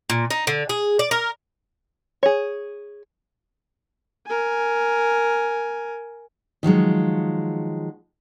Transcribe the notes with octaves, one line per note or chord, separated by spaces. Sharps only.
A#2
D#4
D3
G#4
D5
A#4
G#4 C#5
A#4 G#5
D#3 F3 F#3 G#3